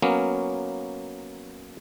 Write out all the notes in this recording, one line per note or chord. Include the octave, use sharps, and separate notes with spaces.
F#3 A#3 B3 C#4